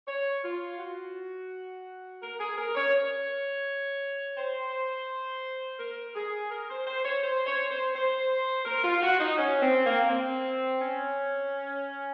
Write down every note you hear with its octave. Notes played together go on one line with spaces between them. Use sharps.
C#5
F4
F#4
A#4
G#4
A#4
C#5
C#5
C5
A#4
G#4
A#4
C5
C5
C#5
C5
C#5
C5
C5
A#4
F4
F#4
D#4
C#4
C4
A#3
C4
C#4